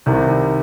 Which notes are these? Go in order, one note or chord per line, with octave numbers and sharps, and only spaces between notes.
C2 C3 D#3